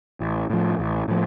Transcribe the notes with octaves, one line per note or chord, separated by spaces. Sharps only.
A1
A2 F3
A1
A2 F3